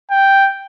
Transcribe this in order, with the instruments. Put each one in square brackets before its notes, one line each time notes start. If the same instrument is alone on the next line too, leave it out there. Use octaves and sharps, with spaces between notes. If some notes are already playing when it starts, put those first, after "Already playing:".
[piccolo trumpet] G5